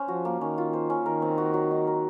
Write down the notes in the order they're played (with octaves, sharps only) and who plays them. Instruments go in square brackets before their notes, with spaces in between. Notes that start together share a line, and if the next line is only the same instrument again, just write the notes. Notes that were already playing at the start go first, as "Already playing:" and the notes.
Already playing: [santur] C#4 C5
[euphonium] F3 [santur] F#4
[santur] A#3
[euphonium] D#3 [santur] C#4
[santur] F4
C5
C#4
[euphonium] D#3 [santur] A#4
[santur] C4
F#4
F#3
D#4
A#4